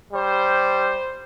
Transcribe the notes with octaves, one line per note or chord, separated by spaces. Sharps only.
G3 C5